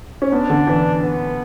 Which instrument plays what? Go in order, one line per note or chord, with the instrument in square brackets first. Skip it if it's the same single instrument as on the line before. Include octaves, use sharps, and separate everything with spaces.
[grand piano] C#4
[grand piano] B3 [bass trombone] D4
[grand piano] D3
E3
[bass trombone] B3